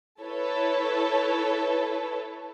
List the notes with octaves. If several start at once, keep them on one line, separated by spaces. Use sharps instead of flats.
E4 A4 B4 C#5